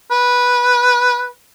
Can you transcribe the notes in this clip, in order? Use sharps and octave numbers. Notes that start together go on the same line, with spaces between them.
B4